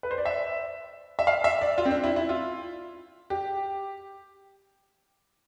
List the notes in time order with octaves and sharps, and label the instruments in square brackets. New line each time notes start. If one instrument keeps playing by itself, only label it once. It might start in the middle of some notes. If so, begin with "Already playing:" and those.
[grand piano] B4
C5
D5
E5
E5
F5
E5
D5
F4
C4
D4
E4
E4
F4
G4